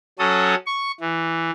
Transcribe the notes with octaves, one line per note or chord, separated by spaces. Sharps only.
F#3 C#4 A4 D#6
C#6
E3